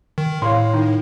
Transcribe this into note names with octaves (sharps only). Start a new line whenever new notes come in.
D#3
A2 C#5 F5 C6
D#3